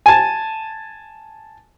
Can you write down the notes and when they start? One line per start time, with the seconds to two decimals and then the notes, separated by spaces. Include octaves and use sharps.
0.06 G#5 A5